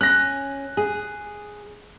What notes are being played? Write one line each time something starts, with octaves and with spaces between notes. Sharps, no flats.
C#4 F#6 A#6
G#4